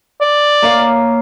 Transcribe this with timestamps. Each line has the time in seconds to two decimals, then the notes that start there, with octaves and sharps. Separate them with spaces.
0.21 D5
0.63 A#3 C#5 F5